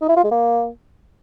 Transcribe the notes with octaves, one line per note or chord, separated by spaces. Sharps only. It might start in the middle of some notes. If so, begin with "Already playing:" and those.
D#4
E4
F4
G#3
A#3